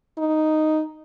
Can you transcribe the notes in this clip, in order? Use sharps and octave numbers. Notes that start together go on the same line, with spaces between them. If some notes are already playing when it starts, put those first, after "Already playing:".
D#4